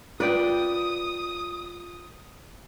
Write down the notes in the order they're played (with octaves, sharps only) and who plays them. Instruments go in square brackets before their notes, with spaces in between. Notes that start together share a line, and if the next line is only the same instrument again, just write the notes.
[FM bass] F4 [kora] B4 D5 G5 [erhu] D#6